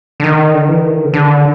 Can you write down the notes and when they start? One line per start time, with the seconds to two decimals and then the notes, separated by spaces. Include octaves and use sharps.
0.20 D3
0.24 D#3
0.54 D3
0.68 E3
0.84 D#3
1.04 C#3
1.14 D3